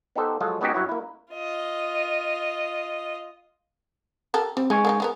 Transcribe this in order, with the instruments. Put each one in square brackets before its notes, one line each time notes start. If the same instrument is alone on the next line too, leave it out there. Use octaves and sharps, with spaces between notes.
[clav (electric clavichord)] B3 D#4 G4 A4 C5
F3 F#3 G#3 F4 F#4 A4
G#3 B3 C#4 D#4 F#4 G4
G2 F#3 E4 F#4
A#3 E4
[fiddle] F4 D#5
[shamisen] G4 A4 A#4
[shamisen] G3 [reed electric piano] C4
[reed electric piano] G#3 G#5 C#6 [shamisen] D#4
[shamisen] A#3 D4 D#4
G#3 B3 A#4